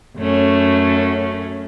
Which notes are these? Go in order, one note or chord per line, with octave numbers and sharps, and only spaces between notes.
F#2 A3 C#4